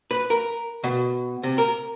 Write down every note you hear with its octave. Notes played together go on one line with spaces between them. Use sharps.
B4
A#4
B2
C3
A#4